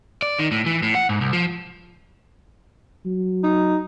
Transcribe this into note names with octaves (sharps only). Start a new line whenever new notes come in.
D5
D#3
A2
E3
A2
F#5
G#2
C2
F3
F#3
D#4